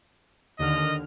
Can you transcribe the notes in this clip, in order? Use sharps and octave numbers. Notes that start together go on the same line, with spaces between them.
D#2 D3 D#5 F6